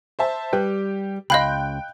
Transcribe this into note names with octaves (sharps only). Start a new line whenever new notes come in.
C5 E5 A5
G3 G4 B4 G5
C#2 D#5 F5 G5 B5 C6 F#6 G6